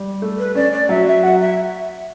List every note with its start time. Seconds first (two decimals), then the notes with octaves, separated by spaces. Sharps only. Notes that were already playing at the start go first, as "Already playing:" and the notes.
Already playing: G3
0.22 A3
0.39 B4
0.55 C#4 D5
0.72 D5
0.89 F#3 E5
1.07 E5
1.23 F#4 F#5
1.40 E5